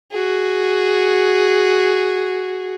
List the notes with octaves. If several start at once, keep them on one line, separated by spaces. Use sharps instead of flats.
F#4 G#4